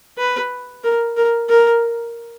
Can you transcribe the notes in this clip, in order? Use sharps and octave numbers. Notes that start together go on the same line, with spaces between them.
B4
A#4
A#4
A#4